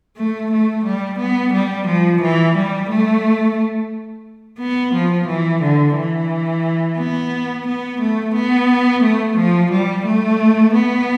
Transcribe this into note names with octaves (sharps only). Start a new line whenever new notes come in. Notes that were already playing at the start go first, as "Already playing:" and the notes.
A3
A3
G3
B3
G3
F3
E3
G3
A3
B3
F3
E3
D3
E3
B3
B3
A3
B3
A3
F3
G3
A3
B3